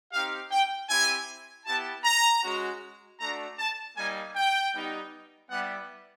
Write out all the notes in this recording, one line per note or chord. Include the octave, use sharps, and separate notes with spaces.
C4 D#4 G4 F5
G5
C4 E4 G4 G#5
B3 E4 G4 A5
A#5
G#3 C#4 F#4
A3 D4 F#4 A#5
A5
G3 A#3 D#4 G#5
G5
G3 B3 D#4 G4
G3 B3 E4 G4 F#5